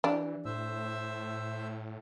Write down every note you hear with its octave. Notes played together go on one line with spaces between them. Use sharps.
E3 D4 G4
A2 C5 E5 E6